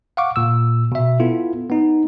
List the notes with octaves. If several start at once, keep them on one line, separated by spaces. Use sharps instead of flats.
F5 F#5 C#6 D6
A#2 E6
B2 E5
B3 E4 F4 A4
B3 D#4